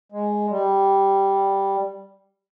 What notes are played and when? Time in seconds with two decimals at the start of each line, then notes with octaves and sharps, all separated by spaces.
0.12 G#3
0.50 G3